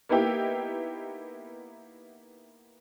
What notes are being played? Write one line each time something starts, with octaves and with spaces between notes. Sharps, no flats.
A#3 B3 D#4 E4 G4